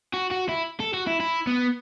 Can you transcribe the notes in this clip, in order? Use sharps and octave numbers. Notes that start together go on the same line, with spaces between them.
F#4
F#4
E4
A4
F#4
E4
E4
B3